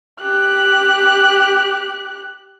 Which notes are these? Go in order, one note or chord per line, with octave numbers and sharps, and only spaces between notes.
G4 F#6